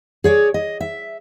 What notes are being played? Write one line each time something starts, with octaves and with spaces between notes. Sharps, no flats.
G#4 C#5 D5
D#5
E5